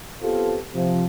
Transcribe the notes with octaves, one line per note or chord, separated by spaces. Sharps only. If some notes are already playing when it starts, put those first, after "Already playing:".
B3 C4 F4 G4 A4
C3 F3